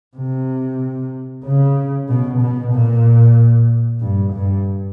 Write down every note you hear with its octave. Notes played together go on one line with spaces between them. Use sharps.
C3
C#3
B2
B2
A#2
G2
G2